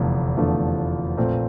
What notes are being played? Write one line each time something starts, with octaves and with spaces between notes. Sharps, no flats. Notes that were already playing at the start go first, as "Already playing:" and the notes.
Already playing: F1 E2 D3 F3 A3
F1 E2 D3 F3 A3
A#1 A#2 A3 C4